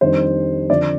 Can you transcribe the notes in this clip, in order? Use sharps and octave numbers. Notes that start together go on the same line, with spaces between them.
F2 D#3 G3 D4 C5
F2 D3 F3 D5